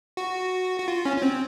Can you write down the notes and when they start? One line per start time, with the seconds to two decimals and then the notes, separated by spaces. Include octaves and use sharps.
0.17 F#4
0.80 F#4
0.88 F4
1.05 C#4
1.17 C#4
1.22 C4